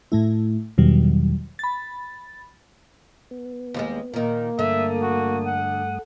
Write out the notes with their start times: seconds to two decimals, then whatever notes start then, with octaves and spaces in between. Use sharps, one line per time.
0.12 A2 A3 E4
0.78 E2 B2 D#3 F#3 G3
1.59 B5 A6
3.31 B3
3.74 D#2 G3 G#3
4.14 A#2 D#3 A#3
4.59 G2 D3 A3 E5 D#6
5.02 F#4
5.46 F#5